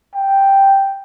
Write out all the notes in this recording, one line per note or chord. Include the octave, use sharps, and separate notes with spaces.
G5